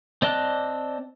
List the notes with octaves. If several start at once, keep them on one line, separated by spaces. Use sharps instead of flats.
C4 D5 D#5 A5 F#6